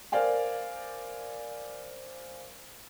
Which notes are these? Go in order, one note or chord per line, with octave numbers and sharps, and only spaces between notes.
A#4 C5 D5 F5 G#5